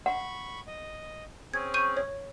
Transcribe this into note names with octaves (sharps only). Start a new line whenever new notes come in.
F#5 B5 C#6
D#5
C4 C#4 G#4 G#6
C#6 G6 D#7
C#5